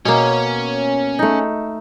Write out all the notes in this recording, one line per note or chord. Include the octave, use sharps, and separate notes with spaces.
B2 A#3 C#4
A3 D#4